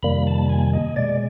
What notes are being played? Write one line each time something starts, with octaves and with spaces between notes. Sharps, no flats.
F2 C3 D#3 G3 A#3 B5
A5
G#5
D#5
B2 G#3 D5